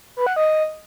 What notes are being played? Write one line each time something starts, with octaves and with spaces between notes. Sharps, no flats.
B4
F#5
D#5